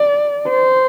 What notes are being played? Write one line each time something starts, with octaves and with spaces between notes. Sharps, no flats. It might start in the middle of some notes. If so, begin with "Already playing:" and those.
Already playing: D5
C5